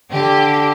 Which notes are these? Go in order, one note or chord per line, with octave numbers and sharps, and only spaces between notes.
D3 G4